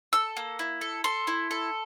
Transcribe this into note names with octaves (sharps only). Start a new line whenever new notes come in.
A4 E6
A#3
E4
A4
A4 C6
E4
A4